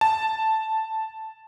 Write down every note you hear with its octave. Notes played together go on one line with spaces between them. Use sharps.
A5